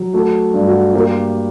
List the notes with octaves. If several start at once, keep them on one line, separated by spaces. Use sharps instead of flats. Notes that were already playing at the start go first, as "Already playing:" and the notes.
Already playing: F#3
A3 F#4
G2
F#4
A#3 G4